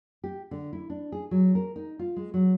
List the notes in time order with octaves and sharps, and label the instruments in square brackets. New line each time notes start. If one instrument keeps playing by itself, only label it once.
[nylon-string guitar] G4
D3
E4
D4
G#4
F#3
A#4
D#4
F4
G#3
F#3